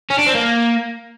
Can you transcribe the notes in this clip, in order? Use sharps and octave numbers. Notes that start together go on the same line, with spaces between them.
C#4
D4
C4
A#3